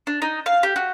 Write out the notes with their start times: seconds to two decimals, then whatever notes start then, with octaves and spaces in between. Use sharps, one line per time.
0.07 D4
0.22 D#4
0.46 F5
0.63 G4
0.76 F#4